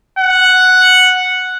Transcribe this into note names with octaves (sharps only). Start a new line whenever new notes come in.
F#5